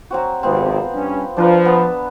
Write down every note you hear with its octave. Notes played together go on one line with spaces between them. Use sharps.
F#3 C4 F#4
G#1 C3 F3 B3 C4
G2 C#4
F3 D4 A#4 B4
B3 A5